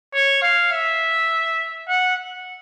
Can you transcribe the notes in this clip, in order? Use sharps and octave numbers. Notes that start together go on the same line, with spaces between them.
C#5
F5
E5
F#5